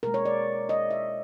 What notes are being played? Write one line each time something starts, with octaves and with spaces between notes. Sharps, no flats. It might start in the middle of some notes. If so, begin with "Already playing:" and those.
B2 G#3 A#4
C#5
D5
D#5
E5